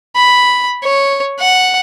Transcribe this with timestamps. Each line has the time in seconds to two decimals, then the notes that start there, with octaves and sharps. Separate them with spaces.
0.16 B5
0.84 C#5
1.40 F#5